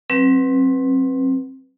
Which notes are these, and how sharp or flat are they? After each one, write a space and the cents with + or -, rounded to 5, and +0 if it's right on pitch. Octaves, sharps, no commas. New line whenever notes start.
F#3 +0 C4 +20 B4 +0